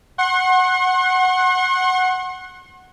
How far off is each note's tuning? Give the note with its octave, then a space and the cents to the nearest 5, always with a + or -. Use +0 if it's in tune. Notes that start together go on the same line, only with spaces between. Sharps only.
F#5 +0 C6 +45